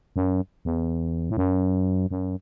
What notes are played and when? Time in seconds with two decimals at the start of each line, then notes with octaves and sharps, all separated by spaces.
0.16 F#2
0.65 E2
1.30 A2
1.37 F#2
2.11 F#2